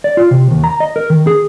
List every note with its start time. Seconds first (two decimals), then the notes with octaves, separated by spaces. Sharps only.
0.04 D5
0.17 F4
0.31 C3
0.51 D#2
0.64 A#5
0.80 D#5
0.96 A#4
1.10 D#3
1.27 G#4